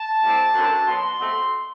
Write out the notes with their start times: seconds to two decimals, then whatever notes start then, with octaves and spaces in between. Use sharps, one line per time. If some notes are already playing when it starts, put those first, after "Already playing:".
Already playing: A5
0.23 A2 G3 C4
0.55 F#2 D3 F#3 A3 C4
0.87 B2 F#3 B3 C6
1.20 B2 A3 C4